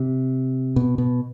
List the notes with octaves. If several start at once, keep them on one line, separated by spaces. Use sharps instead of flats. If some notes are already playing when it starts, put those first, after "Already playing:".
Already playing: C3
B2
B2